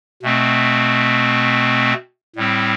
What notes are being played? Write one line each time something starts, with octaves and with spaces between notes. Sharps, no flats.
B2 A3 C4
A2 G3 C4